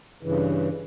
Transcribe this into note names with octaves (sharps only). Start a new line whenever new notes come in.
G2 C#3 E3